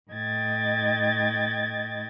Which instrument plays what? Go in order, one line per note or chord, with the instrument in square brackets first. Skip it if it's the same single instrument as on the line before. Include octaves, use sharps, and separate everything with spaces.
[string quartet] A2 D#5 G5 G#6 A6